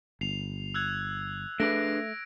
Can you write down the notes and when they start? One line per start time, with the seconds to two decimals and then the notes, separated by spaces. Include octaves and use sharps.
0.21 G1 C7 F7
0.74 E6 F#6 G#6
1.60 A3 D4 G#4 B4 A#6 D7